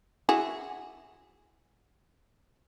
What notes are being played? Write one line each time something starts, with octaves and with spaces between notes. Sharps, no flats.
E4 F#4 G#4